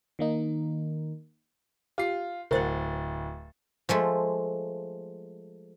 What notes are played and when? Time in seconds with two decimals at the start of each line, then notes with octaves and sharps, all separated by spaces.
0.19 D#3 A#3 D#4
1.98 F4 G4 C7
2.51 D1 A#4 C5 F#5 A6
3.89 F3 G#3 A3